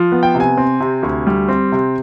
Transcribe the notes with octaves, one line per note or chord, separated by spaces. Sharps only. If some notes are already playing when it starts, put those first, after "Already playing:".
Already playing: F3
B3
G5
C3
G#5
C4
C3
D2
G3
C4
C3